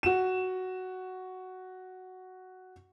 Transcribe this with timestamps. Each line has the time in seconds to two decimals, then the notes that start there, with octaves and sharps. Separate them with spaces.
0.03 F#4 E7